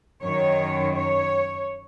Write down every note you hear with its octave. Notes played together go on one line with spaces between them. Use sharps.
F#2 D#3 C#5
C#5